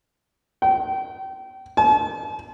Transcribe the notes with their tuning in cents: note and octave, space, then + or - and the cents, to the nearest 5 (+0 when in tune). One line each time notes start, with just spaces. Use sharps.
G5 -30
A5 -45